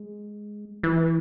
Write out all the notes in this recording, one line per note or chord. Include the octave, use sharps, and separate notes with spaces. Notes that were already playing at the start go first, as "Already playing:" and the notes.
Already playing: G#3
E3